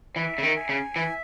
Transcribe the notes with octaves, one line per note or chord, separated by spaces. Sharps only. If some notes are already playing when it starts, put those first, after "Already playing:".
E3 E5
C#3
D#3
G#5
C#3
E3 E5